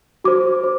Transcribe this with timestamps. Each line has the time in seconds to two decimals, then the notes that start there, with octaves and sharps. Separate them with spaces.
0.24 F#4 C5 D6
0.63 C5